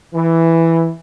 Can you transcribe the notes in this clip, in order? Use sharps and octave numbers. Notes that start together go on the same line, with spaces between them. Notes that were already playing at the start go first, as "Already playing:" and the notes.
E3